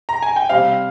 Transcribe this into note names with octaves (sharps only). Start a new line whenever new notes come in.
A#5
G#5
G5
C3 G3 C4 F5